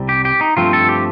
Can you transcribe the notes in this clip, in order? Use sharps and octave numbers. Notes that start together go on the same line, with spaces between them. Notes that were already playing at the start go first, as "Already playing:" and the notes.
Already playing: C2 C3 G3
G4
G4
D#4
G2 F3 A3 C4 F4
A4
G4